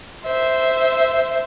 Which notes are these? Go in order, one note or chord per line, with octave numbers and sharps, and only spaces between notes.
C5 E5